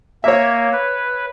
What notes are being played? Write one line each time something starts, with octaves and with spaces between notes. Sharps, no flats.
A#3 C#5 E5
B4